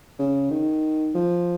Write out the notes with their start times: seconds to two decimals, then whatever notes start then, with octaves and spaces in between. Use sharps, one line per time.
0.19 C#3
0.51 D#3
1.15 F3